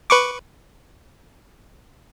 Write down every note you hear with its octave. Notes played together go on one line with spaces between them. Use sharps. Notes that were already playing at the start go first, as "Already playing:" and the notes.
B4 C#6 D6